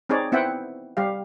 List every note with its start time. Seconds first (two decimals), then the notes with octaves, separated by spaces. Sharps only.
0.09 C4 D#4 G#4 C#5 D5
0.32 B3 C4 E4 E5 F#5 G5
0.97 G3 G4 F5